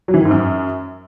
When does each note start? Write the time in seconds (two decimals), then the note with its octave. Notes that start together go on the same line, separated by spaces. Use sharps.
0.08 F#3
0.14 E3
0.19 D#3
0.25 G#2
0.31 F#2